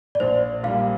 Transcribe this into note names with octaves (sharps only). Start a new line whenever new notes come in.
D5
A#1 C5
A#2 G3 F5